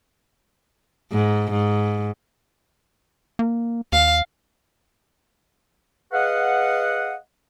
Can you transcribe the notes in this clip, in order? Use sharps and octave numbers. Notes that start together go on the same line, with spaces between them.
G#2
G#2
A#3
D#2 F5
G#4 B4 D#5 F5 F#5